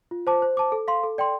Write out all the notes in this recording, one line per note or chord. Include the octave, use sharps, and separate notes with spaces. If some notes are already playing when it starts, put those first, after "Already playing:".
F4
C5 A5 D6
C5
A5 D6
A4
F5 C6
A4
D5 G5 C6